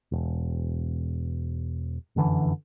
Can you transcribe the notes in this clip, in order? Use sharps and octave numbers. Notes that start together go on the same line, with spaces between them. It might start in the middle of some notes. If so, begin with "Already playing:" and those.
E1
F1 F#2 D3 E3